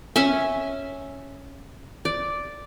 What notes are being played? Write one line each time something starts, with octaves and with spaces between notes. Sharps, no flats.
C#4 E5 G#5
D5